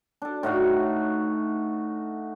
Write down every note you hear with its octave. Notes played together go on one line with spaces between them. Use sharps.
D4 A4
A2 D#4 F#4 F5